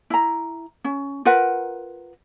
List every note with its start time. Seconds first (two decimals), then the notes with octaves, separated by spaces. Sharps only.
0.10 E4 A#5
0.84 C#4
1.25 F4 A#4 B4 F#5